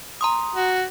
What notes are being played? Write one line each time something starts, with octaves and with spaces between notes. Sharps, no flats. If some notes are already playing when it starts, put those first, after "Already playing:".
A#5 C6 D#6
F#4